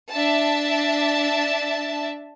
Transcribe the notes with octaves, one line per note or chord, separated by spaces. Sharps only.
D4 E5 A5